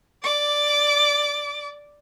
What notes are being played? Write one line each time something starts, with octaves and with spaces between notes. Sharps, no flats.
D5 D6